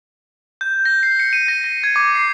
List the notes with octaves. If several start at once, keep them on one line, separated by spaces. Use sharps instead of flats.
G6
A#6
C7
C#7
D#7
A#6
A#6
G#6
D6
C7